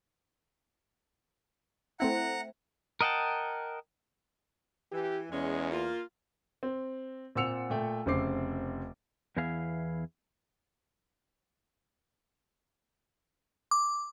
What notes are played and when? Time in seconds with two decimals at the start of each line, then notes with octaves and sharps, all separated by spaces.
2.00 A3 C4 E4 F#5 A#5 F#6
3.01 A#4 D#5 F#5 G5 A5
4.92 E3 G4
5.31 E2 G#3 C#4
5.72 A#3 F4
6.63 C4
7.35 A#2 C4 F#5 E6 C#7 F7
7.70 A#2 A3 G5
8.06 F1 C#3 C4 C5 D6 C7
9.37 E2 E3 B3 E4 G#4 F5
13.71 D6